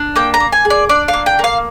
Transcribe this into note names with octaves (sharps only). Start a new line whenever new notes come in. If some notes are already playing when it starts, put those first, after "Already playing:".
Already playing: D4
A#3 G5
A#5
A#3
G#5
G#4
D5
D4 D5
F5
A#3
G5
A#3 F5